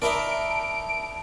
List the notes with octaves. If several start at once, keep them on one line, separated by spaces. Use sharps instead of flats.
D#4 E4 A#4 D5 E5 A5 D7